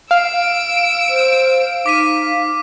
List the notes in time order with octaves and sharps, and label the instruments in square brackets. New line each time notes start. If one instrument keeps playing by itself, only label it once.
[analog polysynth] F5 [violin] E6 D7
[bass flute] C5
[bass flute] D#4 [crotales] D6 B6 D#7